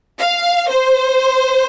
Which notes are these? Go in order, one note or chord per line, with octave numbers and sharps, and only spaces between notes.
F5
C5